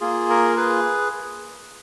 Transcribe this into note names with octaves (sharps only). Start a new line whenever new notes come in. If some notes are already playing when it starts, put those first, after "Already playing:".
A#3 F4 G#4
A#4
G#4 B4